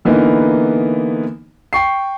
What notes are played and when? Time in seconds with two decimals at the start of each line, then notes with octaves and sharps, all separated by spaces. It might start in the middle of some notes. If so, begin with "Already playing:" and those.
0.05 D3 E3 A#3 B3 D#4
1.73 G5 C#6 C7